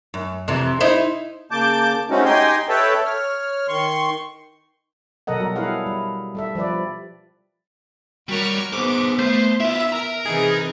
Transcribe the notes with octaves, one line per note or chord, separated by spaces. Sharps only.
F#2
F2 C3 E3
D#4 E4 C5
C#3 A#3 A5 D6 G6
G#3 A3 C4 C#4 D#4 F#4
D#4 G4 D#5 G5 G#5 C6
A4 B4 C#5 E5 G5 A5
C#5 F6
D#3 C6 C#6
B2 F#3 A4 A#4 D#5 F#5
F#3 G3 F#4 A#4
E4 G#4 A4 B4 F5 F#5
G3
G3 A4 E5
F3 G3 B4 D5
G3 F#4 A#4 C#5
B3 G#4 C5 D6
A3 C5
E4 F4 E5
A#4 A#5
C3 E3 D#4 G#4